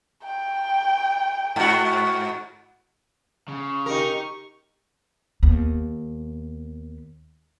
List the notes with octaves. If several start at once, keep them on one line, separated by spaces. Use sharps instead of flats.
G5
G#2 F#4
C#3
D#4 G4 A#4 C#6
D#2 B3